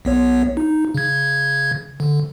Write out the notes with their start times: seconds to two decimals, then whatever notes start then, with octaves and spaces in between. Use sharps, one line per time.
0.05 B1 B3 C#5
0.57 D#4
0.94 C#3 G#6
2.00 D3